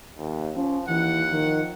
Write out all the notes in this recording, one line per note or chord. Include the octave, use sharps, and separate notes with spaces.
D#2
F3 C#4
D#2 E3 F#5
D#3 F3